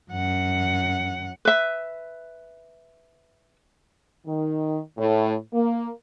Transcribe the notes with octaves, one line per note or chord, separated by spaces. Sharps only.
F#2 F#5
B4 E5
D#3
A2
A#3